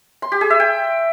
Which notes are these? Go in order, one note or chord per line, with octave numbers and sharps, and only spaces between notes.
C6
G4
G#4
E5
G5